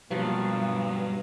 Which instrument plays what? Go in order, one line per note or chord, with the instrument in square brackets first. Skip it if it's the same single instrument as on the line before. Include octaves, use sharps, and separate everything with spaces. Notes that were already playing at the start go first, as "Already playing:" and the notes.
[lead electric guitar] G2 [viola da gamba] B2 A#3 F4 [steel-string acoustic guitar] F3 F#3 [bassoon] B3